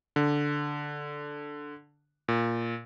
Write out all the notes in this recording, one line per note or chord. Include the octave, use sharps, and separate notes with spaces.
D3
A#2